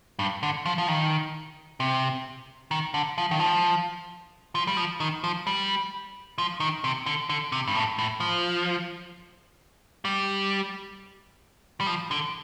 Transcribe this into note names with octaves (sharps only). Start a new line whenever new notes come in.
G2
D3
F3
F3
D#3
C3
D#3
D3
F3
D#3
F3
F3
G3
F3
D#3
F3
G3
F3
D#3
C3
D3
D3
C3
G2
A2
A2
F3
G3
G3
F3
D3